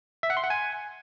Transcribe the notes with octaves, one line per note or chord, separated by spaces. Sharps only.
E5
F#5
C6
F#5
G#5